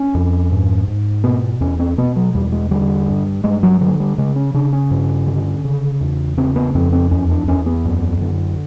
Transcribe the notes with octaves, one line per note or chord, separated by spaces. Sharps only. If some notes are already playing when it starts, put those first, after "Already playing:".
Already playing: C#4
F2
G#2
G#2
B2 B3
E2 C#4
C4
B2 B3
F#3
E2 G3
G#3
D3 G3
G2
G2 G#3
F#3
D3 F#3
G3
C#3 G#3
C#4
C#3 D4
C#4
G2
D3
C#3
E2
C#3 C4
B3
F2 C4
C4
E2 C#4
D4
E2 C#4
B3
F#2
D3